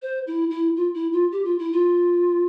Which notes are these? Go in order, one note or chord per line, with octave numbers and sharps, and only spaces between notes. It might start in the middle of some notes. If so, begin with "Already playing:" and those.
C5
E4
E4
F4
E4
F4
G4
F4
E4
F4